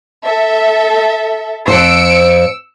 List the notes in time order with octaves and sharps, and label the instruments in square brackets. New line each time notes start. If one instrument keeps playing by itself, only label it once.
[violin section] A4 E5
[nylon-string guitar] F2 C3 C5 [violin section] E6 C#7 D7